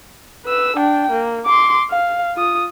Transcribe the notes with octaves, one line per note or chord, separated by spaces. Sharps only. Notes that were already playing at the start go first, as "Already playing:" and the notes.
B4 E6
D4 G5
A#3
C6 D6
F5
F4 D#6